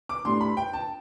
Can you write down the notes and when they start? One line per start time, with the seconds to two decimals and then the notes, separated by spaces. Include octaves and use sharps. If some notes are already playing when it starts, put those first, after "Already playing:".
0.09 D6
0.25 A2 G3 D4 C6
0.41 B5
0.57 G5
0.73 A5